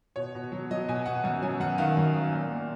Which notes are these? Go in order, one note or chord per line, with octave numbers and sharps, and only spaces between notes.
B2 C#5
B2
F#3
F#3 D#5
B2 G#5
B2 F#5
F#2 G#5
F#3 G#5
F#2 F#5
D#3 F5
F#2
F#3
A#2
A#2